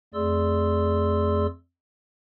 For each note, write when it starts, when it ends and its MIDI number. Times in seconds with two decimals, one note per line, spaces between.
0.14 1.47 41
0.14 1.47 57
0.14 1.47 68
0.14 1.47 74
0.14 1.47 84
0.14 1.47 88